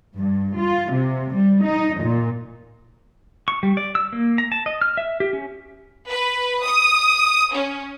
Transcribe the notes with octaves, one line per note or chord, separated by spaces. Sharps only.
G2
F4
C3
G3
D#4
A#2
C#6
G3
D5
E6
A#3
A#5
A5
D#5
F6
E5
G4
C#4
B4
D#6
C#4